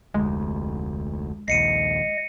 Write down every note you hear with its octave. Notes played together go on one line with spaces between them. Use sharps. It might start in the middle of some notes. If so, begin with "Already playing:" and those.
F1 D2 G#3
A#1 D#2 D#5 C7 C#7 D#7